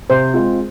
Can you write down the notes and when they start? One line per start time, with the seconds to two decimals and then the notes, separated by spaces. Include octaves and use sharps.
0.10 C3 C5
0.34 G#3 C4 F4